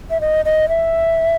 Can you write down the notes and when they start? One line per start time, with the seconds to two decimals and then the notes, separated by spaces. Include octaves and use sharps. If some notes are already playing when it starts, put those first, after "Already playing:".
0.11 E5
0.21 D#5
0.45 D#5
0.69 E5